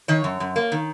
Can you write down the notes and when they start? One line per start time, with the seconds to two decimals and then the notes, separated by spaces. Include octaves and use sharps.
0.08 D#3 C#5
0.24 F#2
0.40 F#2
0.56 A#3
0.72 D#3